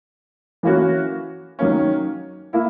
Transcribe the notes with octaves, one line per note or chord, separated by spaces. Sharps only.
E3 A#3 C#4 F#4
D#3 F#3 A#3 C#4
A#3 E4